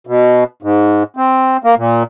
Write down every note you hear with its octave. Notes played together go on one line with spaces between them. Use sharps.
B2
G#2
C4
A#3
A#2